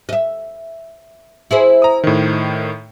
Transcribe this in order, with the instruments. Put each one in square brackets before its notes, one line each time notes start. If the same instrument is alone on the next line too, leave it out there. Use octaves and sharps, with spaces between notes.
[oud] D#5 E5
E4 G#4 C5
[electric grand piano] A#5 D#6
A2 D#3